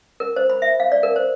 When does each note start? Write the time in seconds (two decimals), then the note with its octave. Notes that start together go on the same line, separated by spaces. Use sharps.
0.20 A#4
0.36 C5
0.50 B5
0.62 E5
0.80 F5
0.92 D5
1.03 A#4
1.16 C5